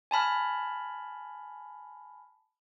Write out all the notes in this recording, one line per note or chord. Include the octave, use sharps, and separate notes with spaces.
G#5 A5 B5 F6